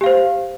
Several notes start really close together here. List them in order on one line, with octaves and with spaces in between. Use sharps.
G4 F5 C5